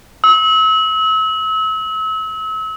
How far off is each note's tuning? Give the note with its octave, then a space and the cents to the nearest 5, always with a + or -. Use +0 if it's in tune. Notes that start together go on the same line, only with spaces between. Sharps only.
E6 -35